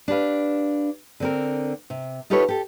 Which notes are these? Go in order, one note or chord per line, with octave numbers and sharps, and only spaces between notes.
D4 G4 B4 F5
D3 C4 A#4
C3
D#4 F4 G4 A4 B4 C#5
G4 A4